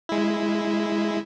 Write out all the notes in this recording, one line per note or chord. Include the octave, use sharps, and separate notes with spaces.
G#3 E4